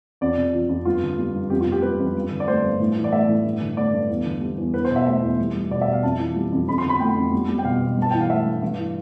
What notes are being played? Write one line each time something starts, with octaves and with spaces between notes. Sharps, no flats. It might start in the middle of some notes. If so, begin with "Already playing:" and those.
F2 D5
C3
F3
F2
G2 F4
D3
G3
G2
F2 G4
F4
C3
G4
G3 B4
F2
G2
D3
D5
A3 C5
G2
A2
E3
D5
A3 E5
A2
G2
D3
A3 D5
G2
E2
D3
G3
E2
E2 B4
C5
B2
E5
A3 E5
E2
G3
G3
B2 D5
E5
B2
F5
F2 A5
E3
G3
F2
F2 B5
C6
D3 B5
A3 G5
F2
G3
G3
G5
B2 F5
B2
G2
A5
E3 G5
F5
A3 E5
G2
G2
E3